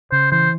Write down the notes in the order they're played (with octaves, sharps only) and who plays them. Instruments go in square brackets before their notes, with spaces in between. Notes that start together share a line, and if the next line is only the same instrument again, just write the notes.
[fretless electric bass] C#3 [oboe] C5
[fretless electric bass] E3 [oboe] C5